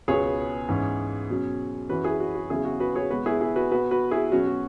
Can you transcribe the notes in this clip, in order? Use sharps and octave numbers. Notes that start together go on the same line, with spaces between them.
C#2 B2 B3 G#4 C#5
G#2 E3 C#4
B2 F#3 C#4
F#2 E3 C#4 F#4 B4
E4 G#4
F#4
F#4
E2 C#3 F#3 C#4 E4 G#4
F#4
F#4 B4
G#4 C#5
B2 G#3 B3 F#4 B4
E4 G#4
E4 G#4
F#4 B4
B2 B3 F#4 B4
F#4 B4
E4 G#4
B2 F#3 C#4 F#4
F#4